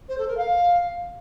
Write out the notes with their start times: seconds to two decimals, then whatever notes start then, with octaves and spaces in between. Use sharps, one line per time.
0.08 C5
0.18 A4
0.28 A#4
0.37 F5